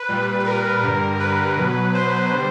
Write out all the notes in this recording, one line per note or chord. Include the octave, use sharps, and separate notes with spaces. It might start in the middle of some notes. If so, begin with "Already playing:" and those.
Already playing: B4
A#2 G3
B4
A#4
G2 D3 G3
B4
B2 F#3
C5
D3 G3